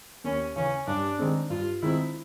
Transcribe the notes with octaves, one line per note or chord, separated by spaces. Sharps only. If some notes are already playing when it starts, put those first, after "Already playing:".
D#2 C#4
C#3 E3 C#4
G2 D4
D#3 G#3 C4
G2 F4
D#3 G#3 C4 E4